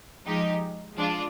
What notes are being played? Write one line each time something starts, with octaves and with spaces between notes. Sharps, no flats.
F3 G#3 D#4 G4
F3 G#3 D4 F4